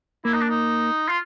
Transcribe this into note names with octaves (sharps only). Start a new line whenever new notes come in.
A#3 E4
D#4
D4
D#4
F4